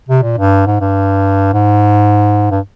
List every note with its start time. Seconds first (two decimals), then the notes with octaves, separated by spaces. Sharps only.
0.08 C3
0.23 A#2
0.37 G2
0.66 G#2
0.81 G2
1.53 G#2
2.51 G2